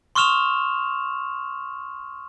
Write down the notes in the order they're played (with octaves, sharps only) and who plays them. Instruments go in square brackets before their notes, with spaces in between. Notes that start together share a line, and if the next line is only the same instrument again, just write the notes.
[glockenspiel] C6 C#6 D#6 F6 E7 F7